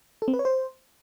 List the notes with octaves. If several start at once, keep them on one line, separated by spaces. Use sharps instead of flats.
A4
C4
B4
C#5
C5